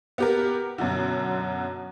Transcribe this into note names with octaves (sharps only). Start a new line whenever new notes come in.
B3 G4 A#4
F#2 B2 D3